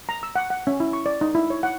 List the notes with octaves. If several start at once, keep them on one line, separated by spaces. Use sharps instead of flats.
A#5
E6
F#5
F#5
C#4
E4
C#6
D5
D#4
E4
C#5
F#5